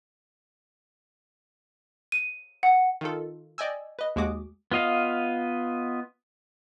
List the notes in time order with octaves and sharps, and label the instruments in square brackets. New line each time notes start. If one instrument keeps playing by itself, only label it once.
[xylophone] D#7
F#5
[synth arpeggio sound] D#3 F4 A4
D5 D#5 G5 G#5 E6
B4 D#5
D#2 G#3 F#4 D6 D#6
[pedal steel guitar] B3 F4 D#5 F5